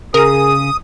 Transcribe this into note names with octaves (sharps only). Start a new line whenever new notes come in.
C#3 G#4 A#4 A#5 D#6